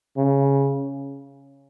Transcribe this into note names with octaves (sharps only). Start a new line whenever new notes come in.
C#3